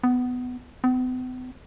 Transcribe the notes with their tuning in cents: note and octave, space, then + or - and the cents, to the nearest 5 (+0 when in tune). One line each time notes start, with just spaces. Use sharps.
B3 +15
B3 +45